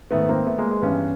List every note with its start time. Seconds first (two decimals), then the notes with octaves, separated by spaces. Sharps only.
0.11 G#2 D#3 A3 B3
0.29 A#3 C4
0.46 A3 B3
0.58 G#3 A#3
0.71 G#3
0.82 G2 E3 B3 C#4